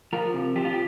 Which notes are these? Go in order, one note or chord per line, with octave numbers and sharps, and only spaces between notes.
F3 F4 A#4
C3
F3 G4
F4
G4